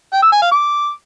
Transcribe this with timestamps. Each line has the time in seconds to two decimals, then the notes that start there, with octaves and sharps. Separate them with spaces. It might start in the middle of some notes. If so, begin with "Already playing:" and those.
0.13 G5
0.23 E6
0.32 G#5
0.42 F5
0.52 D6